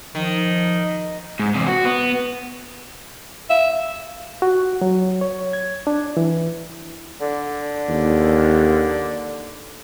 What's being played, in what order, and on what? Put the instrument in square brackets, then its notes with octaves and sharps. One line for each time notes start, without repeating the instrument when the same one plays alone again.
[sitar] D#3 [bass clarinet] F3
[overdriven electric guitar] G#2
E2 C3
F#4
B3
[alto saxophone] E5 [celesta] F5
[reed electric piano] F#4
F#3
C#5
G#6
D4
E3
[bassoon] D3
[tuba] D#2